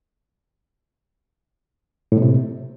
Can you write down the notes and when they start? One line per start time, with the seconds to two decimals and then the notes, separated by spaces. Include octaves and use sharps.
2.12 A2
2.17 B2
2.22 C3